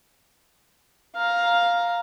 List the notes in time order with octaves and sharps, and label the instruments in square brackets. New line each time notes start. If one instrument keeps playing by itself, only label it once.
[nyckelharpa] F5 A#5